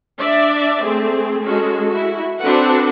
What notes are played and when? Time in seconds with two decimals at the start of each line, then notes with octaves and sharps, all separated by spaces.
0.19 D4 D5 E5
0.82 A3 C4 G#4
1.43 G#3 C#4 F#4 G#4 A4
1.88 E4 F#4
2.40 C4 D4 F#4 A4 B4 F#5